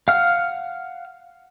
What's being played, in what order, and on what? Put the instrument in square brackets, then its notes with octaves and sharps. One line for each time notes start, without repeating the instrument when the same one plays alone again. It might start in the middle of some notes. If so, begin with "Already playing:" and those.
[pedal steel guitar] F5 F#5 F6